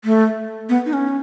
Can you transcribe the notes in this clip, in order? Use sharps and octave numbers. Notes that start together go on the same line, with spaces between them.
A3
B3
D#4
C#4